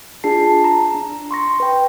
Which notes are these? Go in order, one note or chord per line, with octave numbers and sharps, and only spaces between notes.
D4 F4 G#4 A5 C7
A5
A#5
D4
C6 C#6 A#6
B4 G5